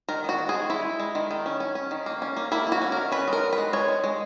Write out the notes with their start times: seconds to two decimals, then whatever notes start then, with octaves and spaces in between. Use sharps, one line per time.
0.09 D#3 A#4
0.24 D#3 F#4
0.39 D#3
0.49 G#4
0.54 G#3
0.70 G#3 E4
0.85 G#3
1.00 G#3
1.15 D#3
1.31 D#3
1.46 C#4
1.60 C#4
1.75 C#4
1.91 D#3
2.06 A#3
2.22 C#4
2.37 A#3
2.52 A#3 E4
2.67 A#3
2.72 F#4
2.82 C#4
2.92 D#3 A#4
3.12 C#4 B4
3.28 G#3
3.33 A#4
3.43 G#3
3.53 B4
3.58 G#3
3.73 G#3 C#5
3.88 G#3
4.04 G#3